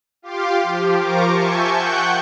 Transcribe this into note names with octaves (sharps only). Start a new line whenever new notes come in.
F4 G4 F5 C6 D6
F3 G4
F4 A#4 C5 A#5 C#6 D6
E5 G#5 A5 C#6 G6
F#5 G5 C#6 F#6 G6